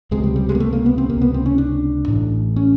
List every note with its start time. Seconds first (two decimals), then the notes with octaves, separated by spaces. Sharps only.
0.11 C#2 C3 G#3
0.24 G3
0.36 G3
0.49 G#3
0.55 A#3
0.60 A3
0.73 A#3
0.86 B3
0.98 C4
1.09 C3 A#3
1.14 C#2
1.21 B3
1.34 C4
1.46 C#4
1.58 D4
2.08 A1 A2
2.56 C#4